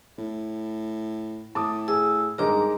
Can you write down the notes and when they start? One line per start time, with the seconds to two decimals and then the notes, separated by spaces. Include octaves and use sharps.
0.18 A2
1.55 A2 A5 D6 D#6
1.88 G#4 E6
2.38 G2 G#3 D#4 A#4 A#5 D6